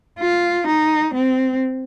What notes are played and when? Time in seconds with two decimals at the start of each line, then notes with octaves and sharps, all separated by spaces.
0.19 F4
0.67 D#4
1.14 C4